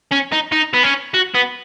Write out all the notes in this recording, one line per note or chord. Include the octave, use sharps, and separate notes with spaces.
C#4
D#4
D#4
B3
C#4
F#4
B3